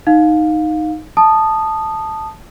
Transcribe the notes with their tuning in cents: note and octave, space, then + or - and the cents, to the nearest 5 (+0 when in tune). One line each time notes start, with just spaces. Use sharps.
D#4 +0 F5 +20
A5 +0 D#6 -15